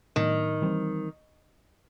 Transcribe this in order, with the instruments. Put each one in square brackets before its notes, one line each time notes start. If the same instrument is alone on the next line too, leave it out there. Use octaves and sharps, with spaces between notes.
[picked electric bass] A2 F#3 B3 D4 [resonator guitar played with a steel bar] D#3
[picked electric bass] E3 G3 C4